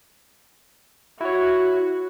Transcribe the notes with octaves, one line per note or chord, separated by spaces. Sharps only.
E4 F#4 C#5